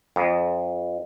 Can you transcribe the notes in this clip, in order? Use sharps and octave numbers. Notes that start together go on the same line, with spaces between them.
F2